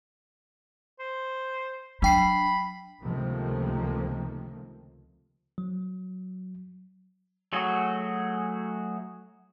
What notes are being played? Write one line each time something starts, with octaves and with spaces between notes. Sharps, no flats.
C5
F#3 D4 G5 B5 C7
C#2 C3 D#3 F3 A3 A#3
F#3
F#3 A3 F#4 G#4